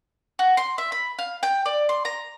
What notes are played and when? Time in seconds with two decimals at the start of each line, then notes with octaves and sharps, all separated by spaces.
0.39 F#4
0.57 C6
0.78 E5
0.92 B5
1.19 F5
1.43 G5
1.66 D5
1.89 C6
2.05 A#5